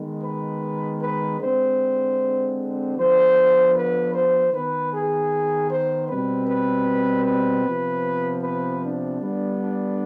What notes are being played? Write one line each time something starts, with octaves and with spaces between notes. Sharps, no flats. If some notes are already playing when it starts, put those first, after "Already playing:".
Already playing: D#3 G#3 B3
B4
B4
D3 G#3 C4 C5
D3 F3 B3 C5
B4
C5
D#3 B3 B4
G#4
C5
B2 G3 C4 B4
B4
B4
C3 F3 B3
B4
D4
D3 G3 B3
D4